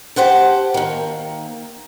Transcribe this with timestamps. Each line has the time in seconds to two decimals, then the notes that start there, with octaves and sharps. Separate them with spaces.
0.16 G4 C5 F#5 A5
0.74 D#3 A#3